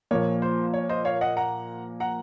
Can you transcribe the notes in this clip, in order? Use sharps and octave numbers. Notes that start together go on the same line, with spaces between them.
A#2 F3 A#3 C#5
C5
C#5
C5 D#5
C#5 F5
D#5 F#5
F#5 A#5
F#5 A#5